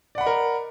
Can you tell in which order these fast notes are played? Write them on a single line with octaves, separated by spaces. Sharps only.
D5 F#5 B5 D#5 A#4